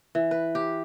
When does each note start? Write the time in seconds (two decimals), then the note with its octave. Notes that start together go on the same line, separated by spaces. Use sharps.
0.15 E3
0.31 B4
0.55 G4